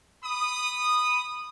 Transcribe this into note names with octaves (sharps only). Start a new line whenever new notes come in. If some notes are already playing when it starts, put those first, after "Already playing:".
B5 D#6